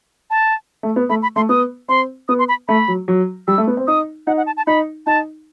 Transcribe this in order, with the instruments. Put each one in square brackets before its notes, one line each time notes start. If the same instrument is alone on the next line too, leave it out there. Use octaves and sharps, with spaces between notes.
[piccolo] A5
[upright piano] A3
B3
[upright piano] A3 [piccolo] B5
[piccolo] B5
[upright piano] A3 [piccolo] C6
[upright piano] B3 [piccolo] D#6
[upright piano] C4 [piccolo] C6
[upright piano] B3 [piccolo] D#6
[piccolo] C6
B5
[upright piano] A3 [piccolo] B5
[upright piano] F#3
F#3
[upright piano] G3 [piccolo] E6
[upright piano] A3
B3
C4
[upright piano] D#4 [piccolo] D#6
[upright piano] D#4 [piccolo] F#5
[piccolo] F#5
A5
A5
[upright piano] D#4 [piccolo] B5
[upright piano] D#4 [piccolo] A5